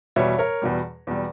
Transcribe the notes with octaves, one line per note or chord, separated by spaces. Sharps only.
E2 B2 G3 C#5 E5
A#4 C#5
E2 B2 G3
E2 B2 G3